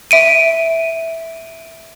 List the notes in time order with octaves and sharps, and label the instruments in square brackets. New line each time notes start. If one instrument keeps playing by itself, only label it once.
[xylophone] E5 D7 D#7